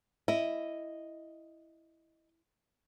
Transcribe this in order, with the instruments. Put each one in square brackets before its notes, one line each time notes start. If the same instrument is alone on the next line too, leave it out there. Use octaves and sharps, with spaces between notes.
[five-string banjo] E4 [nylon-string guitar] D#5